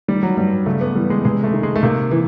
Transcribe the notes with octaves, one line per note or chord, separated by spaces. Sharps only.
D#3 G3
F#3
G2 G3
C#3 A3
B3
E3 G3
G#3
C3 G#3
A3
D#3
G#3
A3
C3 A#3
E3